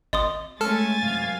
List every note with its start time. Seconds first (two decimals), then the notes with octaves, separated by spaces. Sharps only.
0.13 G#1 D#5 C6 D#6
0.61 G#3 A3 C#4 A4 G#5 A5 F6 A6
1.01 F#2 C3 F5